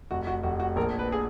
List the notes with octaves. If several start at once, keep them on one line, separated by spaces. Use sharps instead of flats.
F1 F#4
F#4
F1 F#4
F#4
A#1 A#4
B4
G#4